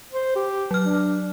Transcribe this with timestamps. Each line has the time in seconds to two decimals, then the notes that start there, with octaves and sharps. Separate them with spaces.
0.12 C5
0.36 G4
0.71 F#3 F6
0.85 D4